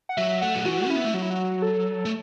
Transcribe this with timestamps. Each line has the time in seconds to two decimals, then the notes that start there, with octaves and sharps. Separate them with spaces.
0.09 F#5
0.17 F#3 E5
0.42 A3 F#5
0.55 F#3
0.65 E3 F#4
0.82 F#4
0.86 C#4 E4
0.96 B3
1.05 A3
1.14 F#3 F#4
1.22 E4
1.30 F#4
1.62 A4
2.05 A3